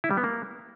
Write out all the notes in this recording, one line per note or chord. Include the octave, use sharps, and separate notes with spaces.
E4
G3
B3
A#3